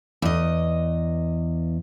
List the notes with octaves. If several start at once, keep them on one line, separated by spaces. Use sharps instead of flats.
E2 D#5